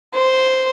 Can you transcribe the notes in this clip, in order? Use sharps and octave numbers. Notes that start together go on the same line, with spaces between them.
C5